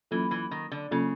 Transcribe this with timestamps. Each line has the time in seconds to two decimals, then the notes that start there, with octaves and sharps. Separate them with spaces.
0.11 E3 F#3 A#3 C#4 F4 A4
0.31 E3
0.51 D#3
0.72 D3
0.91 C#3 F#3 A#3 C#4 F4 A4